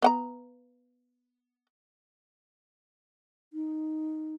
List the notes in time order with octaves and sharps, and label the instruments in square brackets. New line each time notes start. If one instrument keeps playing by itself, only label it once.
[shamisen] B3 F#5 A#5
[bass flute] D#4